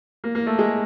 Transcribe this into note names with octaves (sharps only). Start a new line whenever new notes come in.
A#3
A#3
A3
G#3